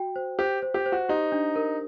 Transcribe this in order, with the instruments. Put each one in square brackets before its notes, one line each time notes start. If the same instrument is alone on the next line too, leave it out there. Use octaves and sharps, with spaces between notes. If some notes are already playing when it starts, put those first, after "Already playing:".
Already playing: [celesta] F#4 G5
C5
[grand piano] G4 [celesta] C5
[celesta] C5
[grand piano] G4
[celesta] C5
[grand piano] F#4
[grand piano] D#4 [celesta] G4
[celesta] D4
A#4